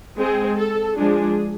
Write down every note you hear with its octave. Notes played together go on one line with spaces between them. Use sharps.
G#3 C4 G#4
A4
F3 G#3 D4 G#4